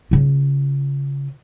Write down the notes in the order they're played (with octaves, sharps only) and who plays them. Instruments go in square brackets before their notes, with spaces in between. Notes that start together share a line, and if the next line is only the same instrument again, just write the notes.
[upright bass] C#3 F4